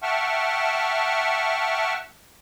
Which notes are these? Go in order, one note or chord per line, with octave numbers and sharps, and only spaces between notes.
E5 F#5 G5 A5 C#6 F6